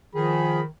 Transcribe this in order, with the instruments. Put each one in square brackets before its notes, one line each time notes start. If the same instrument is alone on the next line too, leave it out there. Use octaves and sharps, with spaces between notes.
[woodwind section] D#3 [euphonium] F3 [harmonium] G#4 [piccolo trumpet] B5